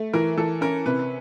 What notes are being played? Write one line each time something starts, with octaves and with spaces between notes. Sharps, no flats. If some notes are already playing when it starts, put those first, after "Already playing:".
Already playing: A3
E3 A#4
E3 A4
C#4 A#4
C3 B4